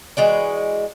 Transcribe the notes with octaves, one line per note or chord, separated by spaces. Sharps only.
E3 G#3 F#4 D5